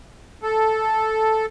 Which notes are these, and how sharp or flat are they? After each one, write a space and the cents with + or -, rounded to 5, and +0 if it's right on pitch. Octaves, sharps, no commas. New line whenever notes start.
A4 -5